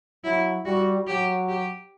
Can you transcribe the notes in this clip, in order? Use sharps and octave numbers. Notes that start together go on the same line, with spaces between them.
F#3 E4
G3 F#4
F#3 G4
G4